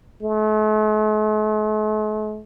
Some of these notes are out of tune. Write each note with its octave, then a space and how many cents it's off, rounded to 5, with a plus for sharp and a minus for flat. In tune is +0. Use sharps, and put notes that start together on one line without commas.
A3 -45